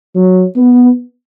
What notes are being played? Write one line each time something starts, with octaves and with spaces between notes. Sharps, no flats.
F#3
B3